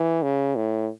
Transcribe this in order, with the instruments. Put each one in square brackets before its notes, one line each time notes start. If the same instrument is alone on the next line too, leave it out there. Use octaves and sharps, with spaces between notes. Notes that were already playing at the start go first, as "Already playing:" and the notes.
Already playing: [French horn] E3
C#3
A2